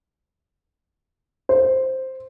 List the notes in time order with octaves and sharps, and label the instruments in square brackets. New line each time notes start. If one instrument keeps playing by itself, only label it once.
[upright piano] C5